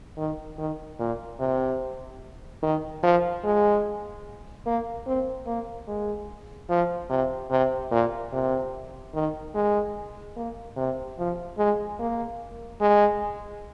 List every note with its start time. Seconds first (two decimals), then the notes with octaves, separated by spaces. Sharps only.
0.17 D#3
0.58 D#3
0.99 A#2
1.39 C3
2.63 D#3
3.03 F3
3.44 G#3
4.66 A#3
5.07 C4
5.47 A#3
5.87 G#3
6.69 F3
7.10 C3
7.50 C3
7.91 A#2
8.32 C3
9.14 D#3
9.55 G#3
10.36 A#3
10.76 C3
11.18 F3
11.58 G#3
11.99 A#3
12.81 G#3